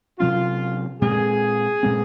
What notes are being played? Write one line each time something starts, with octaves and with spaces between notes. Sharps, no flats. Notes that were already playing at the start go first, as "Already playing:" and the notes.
C3 F#3 C#4 F4
A#2 G#3 C4 G#4
A#2 G#3 C4